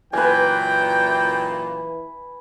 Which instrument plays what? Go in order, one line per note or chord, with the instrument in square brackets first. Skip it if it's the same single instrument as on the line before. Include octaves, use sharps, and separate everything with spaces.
[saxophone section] F#2 A#2 A#3 [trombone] E3 [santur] B4 G#5 [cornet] G5